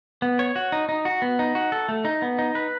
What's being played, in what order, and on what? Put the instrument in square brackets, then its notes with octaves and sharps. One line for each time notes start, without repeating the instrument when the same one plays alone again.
[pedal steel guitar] B3
C#5
F#4
D#4
D#4
F#4
B3
D#4
F#4
A4
A3
D#4
B3
D#4
B4